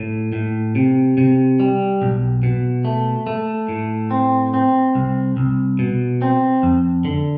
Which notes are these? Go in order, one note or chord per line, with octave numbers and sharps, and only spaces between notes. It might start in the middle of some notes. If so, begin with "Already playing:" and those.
Already playing: A2
A2
C3
C3
G3
B1
B2
A3
A3
A2
C4
C4
C2
C2
B2
C4
F2
D3